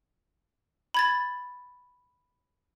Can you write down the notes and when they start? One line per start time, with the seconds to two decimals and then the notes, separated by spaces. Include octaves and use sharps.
0.94 B5 G#6 A6